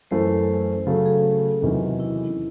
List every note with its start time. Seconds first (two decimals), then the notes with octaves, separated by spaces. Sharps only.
0.11 F#2 E3 A3 C5
0.87 C#3 F#3 A3 A4
1.06 G#4
1.62 E2 C3 D#3 F#3 C#4
2.00 E4